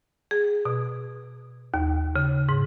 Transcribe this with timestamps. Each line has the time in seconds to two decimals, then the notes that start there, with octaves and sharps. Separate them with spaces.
0.31 G#4
0.65 B2
1.74 D#2
2.16 C#3
2.49 G#2